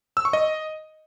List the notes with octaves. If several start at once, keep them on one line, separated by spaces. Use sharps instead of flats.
E6
C#6
D#5